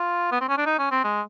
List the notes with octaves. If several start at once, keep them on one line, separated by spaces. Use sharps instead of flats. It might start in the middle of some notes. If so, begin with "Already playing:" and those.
Already playing: F4
B3
C4
C#4
D4
D#4
C#4
C4
G#3